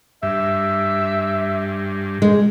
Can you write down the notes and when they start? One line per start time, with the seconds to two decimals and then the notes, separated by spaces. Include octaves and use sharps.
0.23 G2 E5
2.22 G#3